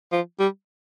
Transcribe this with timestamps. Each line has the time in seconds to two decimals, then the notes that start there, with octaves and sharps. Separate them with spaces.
0.12 F3
0.39 G3